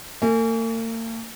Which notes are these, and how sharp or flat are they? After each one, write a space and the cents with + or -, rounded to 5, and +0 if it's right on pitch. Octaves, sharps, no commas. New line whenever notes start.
A#3 -45 G#5 +0